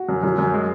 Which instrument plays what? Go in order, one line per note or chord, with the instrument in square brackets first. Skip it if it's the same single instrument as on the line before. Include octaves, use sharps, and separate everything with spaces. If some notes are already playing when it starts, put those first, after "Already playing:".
Already playing: [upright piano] F#4
[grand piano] F#2
[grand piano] F#2 [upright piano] F#4
[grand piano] F#2
G#3